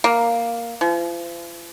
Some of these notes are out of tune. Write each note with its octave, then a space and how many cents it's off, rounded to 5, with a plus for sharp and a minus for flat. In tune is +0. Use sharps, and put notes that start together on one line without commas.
A#3 +0
F3 -40